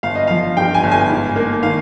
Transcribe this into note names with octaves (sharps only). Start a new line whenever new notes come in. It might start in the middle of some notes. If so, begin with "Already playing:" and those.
G1 F5
D#5
F3 F5
G2 G5
G#5
G1
G#5
G#2
A#3
D#3 F5